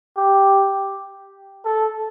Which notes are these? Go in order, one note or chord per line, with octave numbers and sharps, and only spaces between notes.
G4
A4